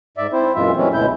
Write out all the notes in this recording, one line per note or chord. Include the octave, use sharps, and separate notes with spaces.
G#2 D5 E5
C4 E4 C5
F#2 A#2 E3 G#3 F4 E5
E3 F#3 G#3 A3 C4 C#4
D2 B2 G#3 E4 G6